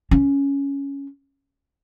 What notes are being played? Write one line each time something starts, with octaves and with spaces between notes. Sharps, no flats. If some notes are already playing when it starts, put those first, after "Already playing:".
C#4